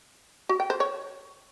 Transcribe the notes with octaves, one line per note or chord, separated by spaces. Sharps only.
F#4
G5
C5
C#5